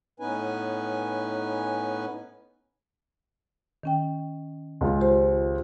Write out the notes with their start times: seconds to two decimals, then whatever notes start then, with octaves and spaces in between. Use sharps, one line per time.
0.20 A2 B3 C#4 D#4 B4 G#5
3.83 D#3 C#4 G5
4.81 C#2 F4
5.01 G4 C5